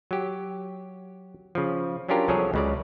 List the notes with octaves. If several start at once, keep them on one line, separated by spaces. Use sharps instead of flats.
F#3 G4
C#3 F3
F#3 C#4 D4 F4 G4 A#4
C2 F3 F#3 G#4 A4 C#5
C#2 C#3 D5